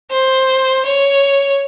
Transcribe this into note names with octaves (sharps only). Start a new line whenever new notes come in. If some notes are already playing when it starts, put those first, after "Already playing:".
C5
C#5